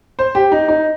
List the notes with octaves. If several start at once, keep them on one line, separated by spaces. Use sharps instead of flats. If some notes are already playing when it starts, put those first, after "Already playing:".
C5
G4
D#4
D#4